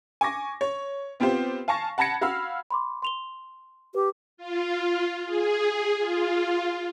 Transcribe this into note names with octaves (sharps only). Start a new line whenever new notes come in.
G#5 C#6 D6 A#6
C#5
B3 C4 F4 G4 C5
F5 G#5 A5 C#6 A#6
F#5 A5 B5 G#6 A#6 C#7
F#4 F5 B5 E6 F6
B5 C6 D6
C6 F7 G7
G4 B4
F4
G#4
F4